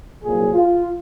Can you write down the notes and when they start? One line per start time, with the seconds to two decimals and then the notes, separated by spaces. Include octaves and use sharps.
0.23 C2 A#2 F#3 A#3 G#4
0.53 F4